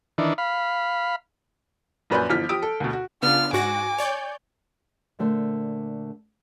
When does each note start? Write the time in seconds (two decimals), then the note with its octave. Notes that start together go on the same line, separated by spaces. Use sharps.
0.18 D#3 E3 D4
0.38 F5 B5
2.10 A#1 F#2 B4 D5 G#5 G6
2.30 G1 E3 F3 F6 B6
2.49 F3 G4 D#6 D7
2.62 A4
2.80 D2 B2
2.93 F#4
3.22 C#3 B3 D4 F4 F6
3.53 G#2 F#4 G#5 D6 A#6
3.98 C#5 D5 G6
5.19 A#2 D3 A3 C5